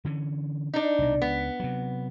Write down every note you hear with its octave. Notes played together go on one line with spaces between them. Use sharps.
D3 E3 C#4
D4 D#4
C2 B2
C#2 B3
C3 F#3